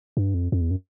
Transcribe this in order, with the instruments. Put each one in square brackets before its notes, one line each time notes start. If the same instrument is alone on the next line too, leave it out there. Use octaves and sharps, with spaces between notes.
[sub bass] G2
F2
F2
E2
F#2